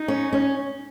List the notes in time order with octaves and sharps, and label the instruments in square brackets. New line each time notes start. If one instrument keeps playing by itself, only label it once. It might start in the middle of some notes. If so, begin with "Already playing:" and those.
Already playing: [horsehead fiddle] D#4
[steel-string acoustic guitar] C#4
C#4